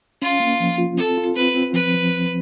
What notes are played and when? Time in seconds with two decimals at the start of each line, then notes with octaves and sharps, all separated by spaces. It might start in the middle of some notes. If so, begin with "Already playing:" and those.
0.21 C#4 F4
0.40 A#3
0.60 F3
0.78 F4
0.97 C4 A4
1.17 F4
1.36 C4 B4
1.54 C4
1.73 F3 B4
1.93 F3
2.11 C2